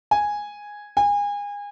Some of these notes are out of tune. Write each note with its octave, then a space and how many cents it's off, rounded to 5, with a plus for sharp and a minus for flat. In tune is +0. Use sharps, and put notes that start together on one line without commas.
G#5 -5
G#5 -30